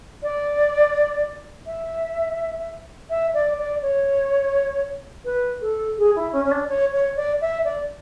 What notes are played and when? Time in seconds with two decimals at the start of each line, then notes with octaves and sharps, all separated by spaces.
0.23 D5
1.66 E5
3.10 E5
3.34 D5
3.58 D5
3.82 C#5
5.25 B4
5.61 A4
5.98 G#4
6.15 E4
6.32 C#4
6.44 C#4
6.51 D4
6.68 C#5
6.92 C#5
7.16 D5
7.41 E5
7.64 D5